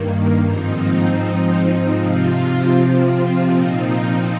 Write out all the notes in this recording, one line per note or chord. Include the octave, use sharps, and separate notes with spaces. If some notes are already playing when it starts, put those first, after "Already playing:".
Already playing: G2 D#3 A#3
G#2 F3 C4 D#4
C3 F3 C4 F4
A#2 F3 C4 D#4